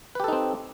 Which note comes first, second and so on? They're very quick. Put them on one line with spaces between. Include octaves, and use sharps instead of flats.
B4 G4 A4 D#4 C4